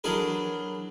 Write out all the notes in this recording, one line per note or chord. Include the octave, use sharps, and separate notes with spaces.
E3 F#3 D4 G#4 A#4